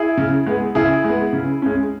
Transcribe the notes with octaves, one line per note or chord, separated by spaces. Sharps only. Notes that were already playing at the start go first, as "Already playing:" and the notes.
Already playing: E4 G#4
C#3
G#3 B3
C#3 E4 G#4
G#3 B3
C#3
G#3 C#4